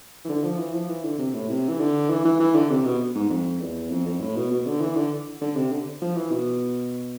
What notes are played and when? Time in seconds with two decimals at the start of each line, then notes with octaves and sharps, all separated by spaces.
0.25 E3
0.29 D3
0.44 F3
0.58 E3
0.74 F3
0.89 E3
1.04 D3
1.19 C3
1.34 A2
1.49 C3
1.69 E3
1.80 D3
2.10 E3
2.25 E3
2.40 E3
2.55 D3
2.70 C3
2.85 B2
3.15 G#2
3.30 F2
3.61 E2
3.90 F2
4.06 F2
4.20 A2
4.36 B2
4.51 B2
4.66 D3
4.81 E3
4.96 D3
5.41 D3
5.56 C3
5.72 D3
6.02 F3
6.16 E3
6.32 B2